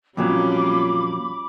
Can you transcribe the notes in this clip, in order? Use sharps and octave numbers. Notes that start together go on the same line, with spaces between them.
F2 A#2 F#3 G3 C#4 F4 B5 D6